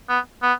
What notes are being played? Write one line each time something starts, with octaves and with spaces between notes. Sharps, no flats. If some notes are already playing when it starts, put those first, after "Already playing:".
B3
B3